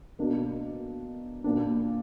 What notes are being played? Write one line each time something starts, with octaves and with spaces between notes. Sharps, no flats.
B2 A#3 D4 A#4
A#2 A#3 D4